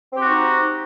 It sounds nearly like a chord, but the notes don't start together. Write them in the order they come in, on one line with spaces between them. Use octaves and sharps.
C4 G4 F#4 D#4